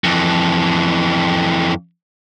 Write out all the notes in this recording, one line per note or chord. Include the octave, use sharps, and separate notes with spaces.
F2 E3